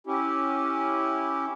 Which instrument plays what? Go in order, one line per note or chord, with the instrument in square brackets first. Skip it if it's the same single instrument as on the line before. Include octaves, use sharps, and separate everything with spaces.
[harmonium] C#4 E4 G4